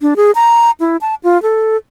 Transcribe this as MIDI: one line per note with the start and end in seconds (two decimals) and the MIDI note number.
0.02 0.14 62
0.16 0.31 68
0.35 0.71 82
0.80 0.97 64
1.01 1.15 81
1.24 1.41 65
1.43 1.77 69